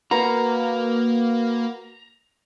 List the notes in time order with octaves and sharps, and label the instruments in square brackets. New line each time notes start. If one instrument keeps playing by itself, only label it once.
[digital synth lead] A#3 [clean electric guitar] F#4 B4 [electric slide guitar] A#5